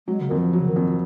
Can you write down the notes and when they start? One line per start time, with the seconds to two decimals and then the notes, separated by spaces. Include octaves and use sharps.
0.08 F#3 G#3
0.20 C#3
0.29 F2 D#3
0.37 F3
0.53 F#3
0.60 C#3
0.68 D#3
0.76 F2